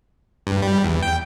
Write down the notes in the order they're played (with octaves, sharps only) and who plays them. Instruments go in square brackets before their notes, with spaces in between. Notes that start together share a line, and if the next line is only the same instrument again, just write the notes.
[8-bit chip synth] G2
G3
E2
G5